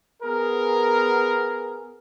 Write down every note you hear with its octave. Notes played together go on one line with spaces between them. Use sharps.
B3 G#4 A#4